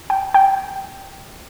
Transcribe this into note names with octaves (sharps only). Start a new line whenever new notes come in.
G5
G5